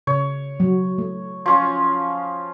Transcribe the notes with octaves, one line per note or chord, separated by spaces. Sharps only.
C#3 C#5
F#3
A3
F3 C#4 F4